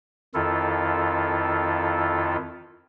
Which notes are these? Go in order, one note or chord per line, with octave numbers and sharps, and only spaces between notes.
F2 D#3 E4 F4 A4